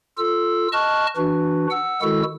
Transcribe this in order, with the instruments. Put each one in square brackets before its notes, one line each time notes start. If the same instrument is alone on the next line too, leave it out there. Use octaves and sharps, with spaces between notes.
[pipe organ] F4 A4 E6
D#5 A5 C#6 F6 F#6
E3 D4 F#4 B4
F#5 E6
D#3 G#3 E4 F#4 A4 E6